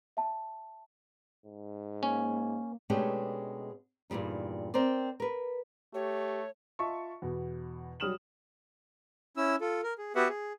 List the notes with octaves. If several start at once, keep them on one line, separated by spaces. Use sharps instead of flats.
E5 A5
G#2
A#3 C#4
A#3
B2 G#3 A3 C#4 D4 G4
E2 G2 A#2 G3 D#4
C4 A#4 C5 D5
A#4 B4
A3 G4 C#5
F4 D#5 E5 A5 C#6
E2 B2
F#3 G3 D#6 F6 E7 F#7
C#4 E4 E6
F4 A4
A#4
G#4
B3 F#4 G4 B4 E5 F#5
G#4